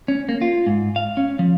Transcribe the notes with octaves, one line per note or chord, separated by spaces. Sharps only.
C#4
A#3
F4
G#2
F5
C#4
F3